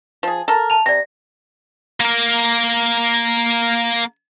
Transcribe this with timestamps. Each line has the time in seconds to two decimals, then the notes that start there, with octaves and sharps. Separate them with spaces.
0.23 F3 G#4
0.48 A4 A#4
0.70 A5 F7
0.86 C3 D5 A#6
2.00 A#3 A#4